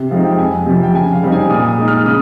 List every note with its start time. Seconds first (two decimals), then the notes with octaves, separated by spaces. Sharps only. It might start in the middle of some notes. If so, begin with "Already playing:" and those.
Already playing: C3
0.11 F3 G#3 C4 D#4 F5
0.24 G5
0.38 F2 G#5
0.66 C3 F3
0.83 G5
0.94 C#3 G#5
1.13 F5
1.23 G3 C4 D#4
1.32 G#5
1.50 A#2 D#6
1.69 D#6
1.78 G#3 D#4
1.88 F6
2.06 C#3 D#6